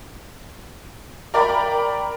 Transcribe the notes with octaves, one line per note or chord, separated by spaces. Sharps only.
A#4 D5 G5 A#5 B5 D6